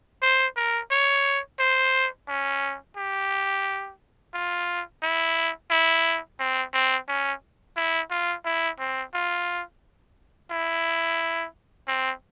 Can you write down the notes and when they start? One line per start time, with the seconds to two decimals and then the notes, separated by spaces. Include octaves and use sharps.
0.22 C5
0.56 A#4
0.91 C#5
1.59 C5
2.28 C#4
2.96 G4
4.34 F4
5.02 E4
5.71 E4
6.39 C4
6.73 C4
7.08 C#4
7.76 E4
8.11 F4
8.45 E4
8.79 C4
9.14 F4
10.50 E4
11.88 C4